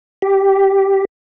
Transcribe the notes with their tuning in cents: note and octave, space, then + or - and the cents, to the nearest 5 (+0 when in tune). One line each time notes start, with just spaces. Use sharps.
G4 -5